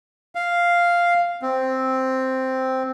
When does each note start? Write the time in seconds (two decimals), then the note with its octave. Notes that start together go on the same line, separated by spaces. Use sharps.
0.35 F5
1.42 C4